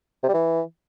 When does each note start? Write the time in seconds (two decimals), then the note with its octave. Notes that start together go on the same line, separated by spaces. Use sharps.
0.23 C3
0.29 G3
0.34 E3